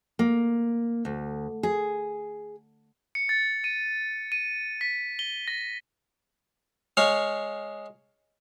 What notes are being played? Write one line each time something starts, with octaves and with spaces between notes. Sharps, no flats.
A#3
D2
G#4
C#7
A6
D#7
D#7
B6
G7
A#6
G#3 C#5 F5